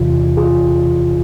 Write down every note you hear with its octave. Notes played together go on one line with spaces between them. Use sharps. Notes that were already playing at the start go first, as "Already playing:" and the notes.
Already playing: E2 C3 E3 F4
F4 G#4